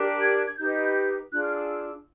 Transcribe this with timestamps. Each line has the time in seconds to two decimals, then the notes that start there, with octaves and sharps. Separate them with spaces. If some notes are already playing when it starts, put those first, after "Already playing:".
Already playing: D4 G4 A#4
0.21 G#6
0.47 G#6
0.58 D#4 G4 B4 G6
1.31 D4 F4 G#4 F#6
1.43 F6
1.56 E6